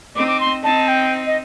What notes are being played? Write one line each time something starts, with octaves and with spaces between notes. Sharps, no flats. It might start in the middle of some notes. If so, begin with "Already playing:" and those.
C4 D#4 D6
D6
C6
C4 D#4 A5
G5
D#5